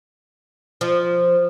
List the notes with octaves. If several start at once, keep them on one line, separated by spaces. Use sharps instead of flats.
F3